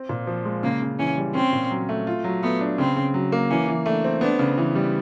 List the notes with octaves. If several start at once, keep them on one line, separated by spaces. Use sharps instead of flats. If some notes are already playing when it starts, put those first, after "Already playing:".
Already playing: C4
A#2
F3
G#3
C#3 A#3
C#3
E3 C#4
G3
C4 C#4
A#2
F#3
A3
F4
F#3
A3 B3
D4
C#3 C4
C#3
F#3
A#3
E3 C#4
E3
A3 D4
C4
B3 D4
C#3
E3
G3